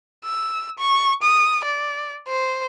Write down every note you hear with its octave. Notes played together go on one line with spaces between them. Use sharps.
E6
C#6
D#6
D5
C5